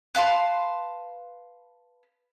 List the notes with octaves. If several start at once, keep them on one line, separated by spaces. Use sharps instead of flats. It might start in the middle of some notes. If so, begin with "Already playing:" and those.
B4 F5 A5 C6